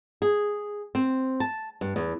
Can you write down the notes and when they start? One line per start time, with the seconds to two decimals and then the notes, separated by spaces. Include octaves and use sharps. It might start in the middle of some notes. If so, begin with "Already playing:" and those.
0.22 G#4
0.95 C4
1.40 A5
1.81 G2
1.96 E2